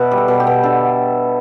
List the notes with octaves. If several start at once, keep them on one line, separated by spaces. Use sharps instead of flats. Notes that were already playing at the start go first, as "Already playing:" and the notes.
Already playing: B2 B4 D5 E5
G3
A4
B2
G4
B2
D3 A4